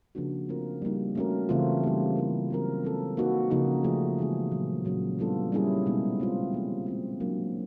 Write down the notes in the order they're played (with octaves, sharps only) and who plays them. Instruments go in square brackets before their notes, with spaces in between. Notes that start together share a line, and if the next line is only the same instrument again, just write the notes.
[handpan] C#3 F3 A#3 D4 F#4
A3 C4 F4 A#4
G3 A#3 D#4
A3 C#4 F#4 A#4
C#3 E3 A3 C4 F4
G3 A#3 D#4 G4
A3 C4 E4 G4 A#4
F#3 A3 C4 F4 A#4
G#3 C4 F4 A4
A#3 D#4 F#4 B4
C#3 F3 A#3 D#4 F#4
F3 A3 C#4 F4 G#4
E3 G#3 B3 D#4 G#4
A#2 F#3 A#3
A#2 F#3 A#3 C#4
G3 B3 D4 F4 A4
G3 A#3 C#4 E4 G#4
B2 G#3 B3 D#4
G#3 C4 F4
F3 A#3 D#4 G#4
G#3 C4 F4
F#3 A#3 D4